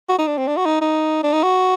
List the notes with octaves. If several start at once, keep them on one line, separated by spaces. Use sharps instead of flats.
F#4
D#4
D4
C4
D4
F#4
D#4
D#4
D4
D#4
F#4